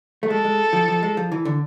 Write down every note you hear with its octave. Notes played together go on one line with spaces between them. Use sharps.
A3
G#3 A4
G#3
F3
F3
G#3
F3
E3
D3